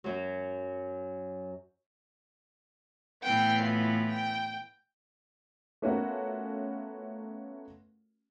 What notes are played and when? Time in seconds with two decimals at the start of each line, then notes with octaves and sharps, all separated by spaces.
0.04 F#2 F#3
3.23 A2 E3 B3 G5 C7
3.62 F4
4.09 G5
5.82 A3 B3 C#4 F4 F#4 A#4